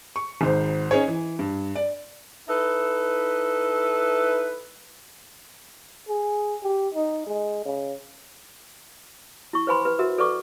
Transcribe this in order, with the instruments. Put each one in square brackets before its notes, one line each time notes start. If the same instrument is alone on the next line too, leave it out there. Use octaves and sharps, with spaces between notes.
[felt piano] C#6
G#1 G#2 C5
C#4 D#4 G#4 C#5
E3
G2
D5
[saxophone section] D#4 E4 A4 B4
[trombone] G#4
G4
D#4
G#3
C#3
[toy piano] E4 C#6
B4 C5 F#5 G#5 B5 C6
B4
F#4 A#4 E5 F#5
A4 B4 D5 F#5 C#6 D6